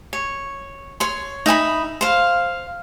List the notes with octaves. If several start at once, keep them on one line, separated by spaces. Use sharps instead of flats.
C#5
C#5 C6
D#4 E5 G5 B5
C5 F5